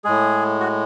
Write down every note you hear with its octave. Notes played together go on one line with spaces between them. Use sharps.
A2 G#3 G#4
F#4